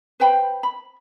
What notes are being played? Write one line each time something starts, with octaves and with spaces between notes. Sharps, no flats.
B4 C5 G5 B5
B5